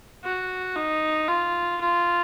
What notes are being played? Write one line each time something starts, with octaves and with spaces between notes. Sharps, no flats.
F#4
D#4
F4
F4